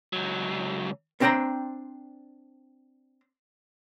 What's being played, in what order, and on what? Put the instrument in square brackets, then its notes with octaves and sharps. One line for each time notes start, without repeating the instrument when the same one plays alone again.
[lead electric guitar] C#2 F#3
[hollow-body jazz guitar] B3 C4 D4 C5 G5 A#5